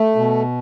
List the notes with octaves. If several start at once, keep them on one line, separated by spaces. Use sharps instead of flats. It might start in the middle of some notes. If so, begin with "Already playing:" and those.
Already playing: A3
B2